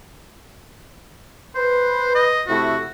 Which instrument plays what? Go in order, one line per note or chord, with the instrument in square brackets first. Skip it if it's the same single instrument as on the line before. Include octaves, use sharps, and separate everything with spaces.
[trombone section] B4 [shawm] C5
[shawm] D#5
[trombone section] C3 A3 E4 [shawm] F#4